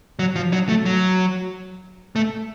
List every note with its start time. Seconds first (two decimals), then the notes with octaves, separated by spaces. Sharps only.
0.19 F#3
0.36 F3
0.53 F#3
0.69 A3
0.85 F#3
2.16 A3